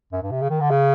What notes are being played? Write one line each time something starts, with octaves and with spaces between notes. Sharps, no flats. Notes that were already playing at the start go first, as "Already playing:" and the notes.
F#2
G2
C3
C#3
D#3
D3
C#3